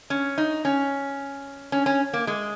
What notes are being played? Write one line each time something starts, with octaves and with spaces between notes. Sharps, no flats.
C#4
D#4
C#4
C#4
C#4
A#3
G#3